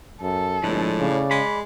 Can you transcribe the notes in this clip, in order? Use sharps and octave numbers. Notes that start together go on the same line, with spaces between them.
F#2 A4
G1 A2 F3 G#3 D4
C#3 D5
G#3 B5